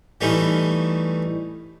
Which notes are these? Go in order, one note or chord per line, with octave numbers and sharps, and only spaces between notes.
E3 G3 A3 C#4 D#4